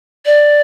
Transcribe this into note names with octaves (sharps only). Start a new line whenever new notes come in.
D5